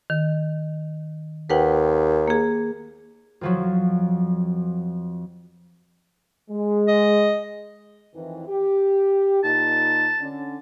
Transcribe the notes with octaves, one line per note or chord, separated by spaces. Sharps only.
D#3
D#2 B4 F#5 G5
A#3 G#4
F2 F3 F#3
G#3
D#5
F2 D#3 E3
G4
A#2 D#4 A5
D3 C#4